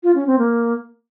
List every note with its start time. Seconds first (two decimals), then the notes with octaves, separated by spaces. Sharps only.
0.03 F4
0.15 C#4
0.27 C4
0.39 A#3